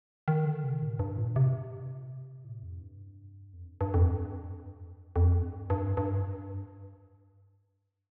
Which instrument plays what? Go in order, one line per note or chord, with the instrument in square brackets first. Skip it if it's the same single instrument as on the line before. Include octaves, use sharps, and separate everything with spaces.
[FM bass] D#3
D3
C3
A2
G2
A#2
C3
A2
F2
G2
F2
G2
G2
F2
G2
F2
G2
G2
G2